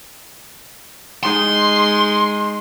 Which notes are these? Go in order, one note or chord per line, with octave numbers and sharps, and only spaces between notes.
G#3 D#4 C6